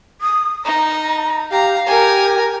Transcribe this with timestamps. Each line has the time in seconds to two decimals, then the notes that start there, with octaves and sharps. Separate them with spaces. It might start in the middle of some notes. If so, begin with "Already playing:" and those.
0.21 D#6
0.65 D#4 A#5
1.51 G4 F5 A#5
1.87 G4 A#4 G#5